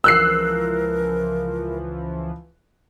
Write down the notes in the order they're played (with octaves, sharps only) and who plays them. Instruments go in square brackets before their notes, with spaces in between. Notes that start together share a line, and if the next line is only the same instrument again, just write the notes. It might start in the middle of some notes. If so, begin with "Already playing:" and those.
[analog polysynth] C#2 E3 F3 [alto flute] A#4 [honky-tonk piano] E6 F#6 C7